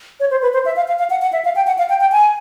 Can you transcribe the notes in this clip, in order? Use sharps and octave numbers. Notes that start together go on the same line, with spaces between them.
C#5
C5
B4
C5
E5
F5
F5
F5
F#5
F#5
E5
F5
G5
F#5
F5
G5
G5
G#5